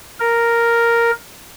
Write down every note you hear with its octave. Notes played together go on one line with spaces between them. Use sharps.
A#4